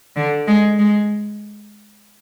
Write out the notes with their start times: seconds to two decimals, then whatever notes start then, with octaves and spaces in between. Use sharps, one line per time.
0.16 D3
0.47 G#3
0.79 G#3